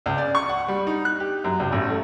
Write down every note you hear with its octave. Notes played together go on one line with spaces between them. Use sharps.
C#2
D5
C#6
F#5
G3
D#4
F#6
G4
F#2
C#2
A1
A3